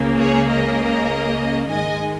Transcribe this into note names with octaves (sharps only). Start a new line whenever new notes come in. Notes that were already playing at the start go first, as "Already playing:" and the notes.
Already playing: C#2 C#3 A#3
G#4 C#5
A#4 D#5
G#2 D#3 G#3 D#5 G#5